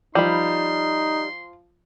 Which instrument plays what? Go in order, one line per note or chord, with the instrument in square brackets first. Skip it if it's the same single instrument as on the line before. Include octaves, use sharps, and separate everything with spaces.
[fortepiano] F3 [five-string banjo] G3 B5 [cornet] D#4 [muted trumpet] C6